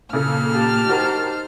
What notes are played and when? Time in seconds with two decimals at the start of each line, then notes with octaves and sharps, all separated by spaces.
0.13 A#2 C#3 A#3 A4 F6
0.52 G4 A5
0.89 D#4 F#4 A#4 C5